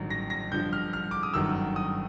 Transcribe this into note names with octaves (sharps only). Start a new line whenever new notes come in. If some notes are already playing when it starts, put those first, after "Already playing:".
Already playing: A1 G2 D#3 F#3
A#6
A#6
G2 D3 F3 G6
F6
F6
D6
D#6
G1 F#2 D#3 E6
D#6